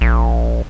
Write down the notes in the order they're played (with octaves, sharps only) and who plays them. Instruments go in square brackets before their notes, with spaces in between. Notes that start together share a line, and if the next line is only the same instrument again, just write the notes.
[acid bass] A#1